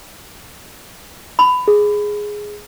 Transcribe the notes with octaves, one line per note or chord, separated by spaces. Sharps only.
B5
G#4